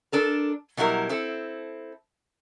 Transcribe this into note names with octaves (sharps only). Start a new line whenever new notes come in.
D4 A4 A#4
B2 F#3 G3 E4 A#4
C4 E4 A4